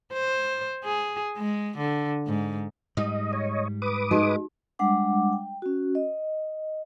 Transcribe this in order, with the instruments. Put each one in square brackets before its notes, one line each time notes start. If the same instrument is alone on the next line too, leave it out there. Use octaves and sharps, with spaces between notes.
[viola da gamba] C5
G#4
G#3
D3
G#2
[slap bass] G#2 G3 [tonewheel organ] D#5
[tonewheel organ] C#5 D#5
B4 D6 D#6
[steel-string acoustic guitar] G#3 [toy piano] D#4 F#4
[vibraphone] G3 G#3 D4 F#5 D6
G5
C#4 F#4
D#5